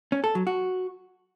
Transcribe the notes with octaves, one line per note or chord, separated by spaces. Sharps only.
C#4
A4
F#3
F#4